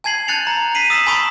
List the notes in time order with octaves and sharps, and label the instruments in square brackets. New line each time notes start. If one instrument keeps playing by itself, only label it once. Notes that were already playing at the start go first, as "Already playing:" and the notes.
[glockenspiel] G#5 A5 G#6 C7 F#7
A5 F#6 G6 A6 C#7 F7
A#5
B6 C7 D#7 F#7
D#6 E6 A6 B6 E7
G#5 A5 B5 C#6 D#6 B6